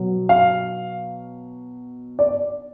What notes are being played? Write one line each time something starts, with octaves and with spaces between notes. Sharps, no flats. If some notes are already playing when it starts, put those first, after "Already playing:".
Already playing: B2 F#3 B3
F5
D5